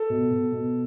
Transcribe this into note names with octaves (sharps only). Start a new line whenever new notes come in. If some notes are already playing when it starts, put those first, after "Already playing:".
Already playing: A4
B2
B2
B2